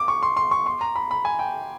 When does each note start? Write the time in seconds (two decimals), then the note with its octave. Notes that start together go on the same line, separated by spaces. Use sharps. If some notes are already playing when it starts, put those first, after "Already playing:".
Already playing: D6
0.08 C#6
0.23 C6
0.37 C6
0.51 C#6
0.66 C6
0.81 A#5
0.96 B5
1.11 B5
1.25 G#5
1.39 G5